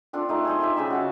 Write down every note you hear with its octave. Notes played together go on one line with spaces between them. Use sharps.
C4 D4 F4 A4
A3 D#4 F4
G#4 C5 D#5
E4 F4 G4 E5
C#3 G#4 D#5 B5
F#4 E5 F5